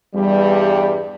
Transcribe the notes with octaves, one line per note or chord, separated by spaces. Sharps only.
E2 G2 G3